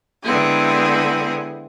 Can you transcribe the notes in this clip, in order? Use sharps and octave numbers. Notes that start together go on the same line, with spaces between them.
D3 G#3 B3 C4 E4 G#4